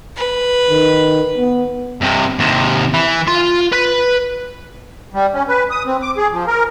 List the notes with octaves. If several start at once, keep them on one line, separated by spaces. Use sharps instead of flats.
B4
D#3
B3
G2 C3
D#2 C3
E3
F4 C6
B4
G3
C#4
B4
D#6
C4
D6
G#4
F3
A#4